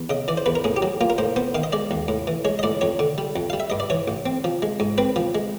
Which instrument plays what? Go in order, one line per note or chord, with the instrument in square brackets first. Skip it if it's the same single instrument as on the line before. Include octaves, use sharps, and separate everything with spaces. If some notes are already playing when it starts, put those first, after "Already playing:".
Already playing: [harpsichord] E2
C#3 D#5
E3 D5
C5
E2 B4
A#4
A2 G#4
G4
F#3
A#3 F4
A#4
A2 C5
B3 C5
D#3 F5
D#5
G#3 D5
D#2
A2
E3
G#3 C#5
D#5
A2 D5
F2 C#5
D3
G3
F2
G3 F5
E5
G2 D#5
D5
E3 C#5
A1
C4
F3
G#3
G#2
C4 B4
F3
G#3